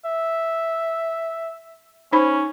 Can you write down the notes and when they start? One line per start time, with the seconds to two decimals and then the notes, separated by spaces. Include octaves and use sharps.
0.05 E5
2.12 C#4 D#4 C5 B5